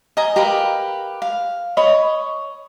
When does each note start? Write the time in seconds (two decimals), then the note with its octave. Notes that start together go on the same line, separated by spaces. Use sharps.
0.17 D#5 G#5 A#5
0.36 G4 A#4 B4 F5
1.22 F5
1.77 C#5 D#5 B5